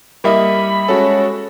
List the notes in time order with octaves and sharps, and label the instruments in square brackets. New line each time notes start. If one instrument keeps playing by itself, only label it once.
[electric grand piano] G3 [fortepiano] A#3 E4 D#5 [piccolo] B5
[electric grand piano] G#3 F#4 A4 [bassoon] C#4